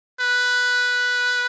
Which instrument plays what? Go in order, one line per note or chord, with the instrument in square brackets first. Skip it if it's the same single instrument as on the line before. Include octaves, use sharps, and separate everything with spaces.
[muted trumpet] B4